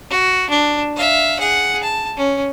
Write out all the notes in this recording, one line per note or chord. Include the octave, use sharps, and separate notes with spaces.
F#4
D4
E5 F5
G#4 F#5
A5
C#4